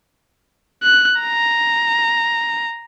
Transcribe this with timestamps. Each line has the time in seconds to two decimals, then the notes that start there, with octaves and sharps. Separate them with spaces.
0.83 F#6
1.21 A#5